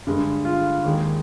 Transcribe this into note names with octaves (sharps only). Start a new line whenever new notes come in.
G2 D3 G#3
F4
D#2 D#3 G#3